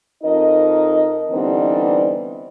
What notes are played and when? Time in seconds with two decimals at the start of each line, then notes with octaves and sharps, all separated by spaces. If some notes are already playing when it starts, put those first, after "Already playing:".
0.24 F2 D#4 A#4 D#5
1.31 D3 E3 G3 B3 C4 D#4